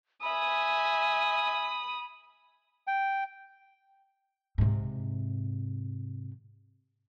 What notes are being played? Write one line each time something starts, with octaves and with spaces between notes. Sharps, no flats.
E5 G#5 B5 D#6
G5
G#2 C3